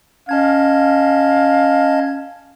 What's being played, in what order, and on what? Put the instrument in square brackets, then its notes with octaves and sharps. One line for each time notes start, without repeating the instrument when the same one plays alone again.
[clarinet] C#4 [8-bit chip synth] D#5 A5 G#6 [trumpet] F5